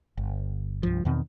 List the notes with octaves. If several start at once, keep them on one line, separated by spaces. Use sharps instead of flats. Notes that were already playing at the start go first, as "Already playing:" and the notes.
G1
C2 G2 F3
E2 B2 D#3 C4